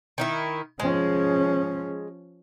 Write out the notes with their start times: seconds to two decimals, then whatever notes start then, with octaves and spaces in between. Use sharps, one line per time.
0.18 D#3 D#4 E4
0.80 F3 G#3 C#4